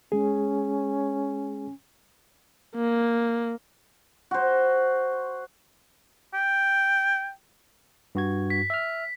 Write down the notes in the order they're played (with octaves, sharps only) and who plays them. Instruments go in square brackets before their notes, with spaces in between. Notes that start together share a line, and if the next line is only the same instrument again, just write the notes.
[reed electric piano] G#3 G#4 [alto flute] C#4
[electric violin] A#3
[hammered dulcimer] F#4 C5
[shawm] G5
[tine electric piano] G2 F#4 G#6
[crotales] B6
[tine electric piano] E5 F6